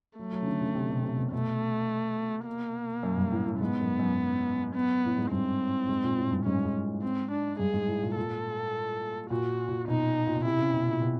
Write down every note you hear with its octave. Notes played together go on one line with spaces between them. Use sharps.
F#3 A3
F#3
C#3
D3
C#3
C3
B2
C3
B2
B2 A3
A#3
F#2
G2
A2
A2
G#2 B3
F#2
F#2
B3
A2
G#2
G2 C4
G#2
A#2
A2
G2
G#2 C#4
G2
G#2
C4
D4
G2 G#4
G#2
A2
A#2
A#2 A4
A#2 F#4
A#2
B2 D#4
A#2
B2
C3 E4
C#3
B2
A#2
B2